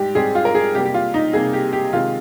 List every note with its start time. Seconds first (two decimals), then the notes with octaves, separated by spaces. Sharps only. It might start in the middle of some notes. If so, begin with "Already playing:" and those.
Already playing: G#2 G3 G4
0.15 G#2 G3 C4 G#4
0.35 F4
0.45 A#4
0.55 G#4
0.75 C3 G3 A#3 G4
0.86 G4
0.94 F4
1.14 D#4
1.33 C3 G3 A#3 G#4
1.53 G4
1.73 G4
1.93 C3 D#3 G#3 C4 F4